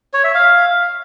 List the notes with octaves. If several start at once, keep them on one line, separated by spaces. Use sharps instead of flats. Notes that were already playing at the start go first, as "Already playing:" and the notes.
C#5
E5
F5